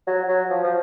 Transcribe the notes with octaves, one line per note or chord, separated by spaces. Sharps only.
F#3
F#3
F3
F3